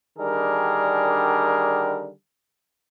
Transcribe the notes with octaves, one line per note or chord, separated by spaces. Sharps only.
D3 D#3 G3 D4 G#4 A#4